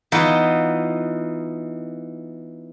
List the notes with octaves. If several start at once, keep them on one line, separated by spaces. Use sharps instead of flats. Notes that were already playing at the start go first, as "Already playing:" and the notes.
E3 B3 D#4 F4